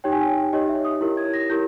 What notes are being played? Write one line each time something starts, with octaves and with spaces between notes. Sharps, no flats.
D#4 G4 C#5 G5
G#5
G5
D#4 G4 C#5 D#5
E5
D#6
E4 G4 A#4 C#5
G#6
A#6
E4 G4 A#4 G6